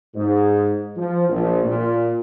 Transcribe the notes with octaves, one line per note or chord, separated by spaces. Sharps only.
G#2
F3
A#1
A#2